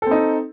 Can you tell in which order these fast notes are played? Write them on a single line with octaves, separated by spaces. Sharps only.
A4 C4 D#4